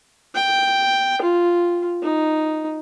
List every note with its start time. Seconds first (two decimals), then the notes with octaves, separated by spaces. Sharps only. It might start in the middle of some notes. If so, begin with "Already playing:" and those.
0.35 G5
1.22 F4
2.02 D#4